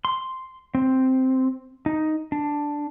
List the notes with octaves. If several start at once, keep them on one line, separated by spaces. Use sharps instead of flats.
C6
C4
D#4
D4